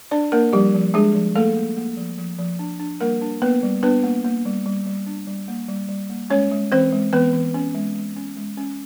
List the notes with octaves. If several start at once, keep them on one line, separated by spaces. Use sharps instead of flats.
D4 D5
A#3 D4 A#4
F3 G3 G4
F3
G#3 D4 G#4
F3
A3 A#3 A4
A#3
A#3
F3
F3
F3
D4
D4
G3 A#3 A#4
D4
A#3 B3 B4
G3
B3 D4 B4
A#3
A#3
G3
G3
G3
D4
G3
A#3
G3
G3
A#3
G#3 C#4 C#5
G#3
E3 C4 C5
G#3
E3 B3 B4
E3
C#4
G#3
G#3
C#4
G#3
C#4